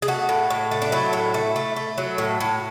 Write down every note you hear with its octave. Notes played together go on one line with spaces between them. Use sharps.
G#4
A3 F#4
A2
A2
A3
D4
F#3 E4
A2
A3
A3
A3
F#3
A2
A2